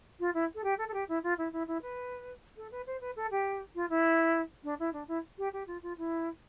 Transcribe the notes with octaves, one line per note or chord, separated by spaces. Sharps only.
F4
E4
A4
G4
A4
A4
G4
E4
F4
E4
E4
E4
B4
A4
B4
C5
B4
A4
G4
F4
E4
D4
E4
D4
E4
G4
G4
F4
F4
E4